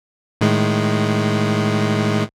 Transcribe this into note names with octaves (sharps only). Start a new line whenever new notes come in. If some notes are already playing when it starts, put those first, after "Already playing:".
A2 D#3 G#3